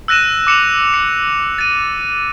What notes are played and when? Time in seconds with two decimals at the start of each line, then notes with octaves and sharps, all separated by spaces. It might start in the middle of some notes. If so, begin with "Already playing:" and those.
0.08 E6 F#6 A#6 D#7 E7
0.47 D6 C#7 E7 F7
0.94 C#7
1.58 A6 D#7